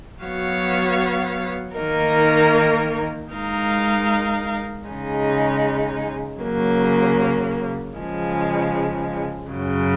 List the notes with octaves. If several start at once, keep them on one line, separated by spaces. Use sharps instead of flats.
F#3 B3 F#4 C#5 F5
D#3 A#3 D#4 A#4
G#3 D#4 A#4 F5
C#3 G#3 D#4
C#3 F#3 A#3
C#3 F3 G#3
F#2 C#3 F#3